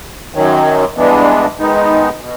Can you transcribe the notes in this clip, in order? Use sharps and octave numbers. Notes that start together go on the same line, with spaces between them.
F#2 D#3 F#3
G2 E3 G#3 B3 D4
D#3 G#3 B3 D#4
B2